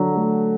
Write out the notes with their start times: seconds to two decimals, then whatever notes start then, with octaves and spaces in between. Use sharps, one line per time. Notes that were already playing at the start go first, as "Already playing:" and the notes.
Already playing: D3 F#3
0.15 A3